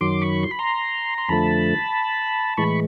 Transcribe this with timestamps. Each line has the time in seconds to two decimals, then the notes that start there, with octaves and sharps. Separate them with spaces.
0.01 F#2 D#3 F#3 C6 D6
0.22 B5 C#6
0.43 C6
0.51 B5
0.59 A#5 C6
1.18 C6
1.28 F2 D3 F3 A3 A5 B5
2.57 A2 E3 G#3 B5 C#6